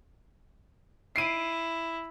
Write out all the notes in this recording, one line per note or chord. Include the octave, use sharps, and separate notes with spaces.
E4 C7 D7 D#7